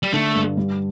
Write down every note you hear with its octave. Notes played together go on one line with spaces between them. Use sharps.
G3
D3 A3
G2
G3